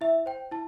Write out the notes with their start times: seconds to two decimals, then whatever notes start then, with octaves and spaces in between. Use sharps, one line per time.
0.01 E4 E5
0.26 C5 G5
0.51 E4 A5